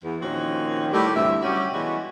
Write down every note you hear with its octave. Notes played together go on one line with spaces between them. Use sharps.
E2
A#2 D#3 F3 C4 C#4 F#4
A2 G3 G4
D2 G2 C3 E3 E5
F#3 G3 C#4 F#4 G4
B2 E3 G3 G#3 F#4